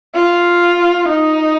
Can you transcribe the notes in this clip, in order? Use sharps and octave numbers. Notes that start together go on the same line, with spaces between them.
F4
D#4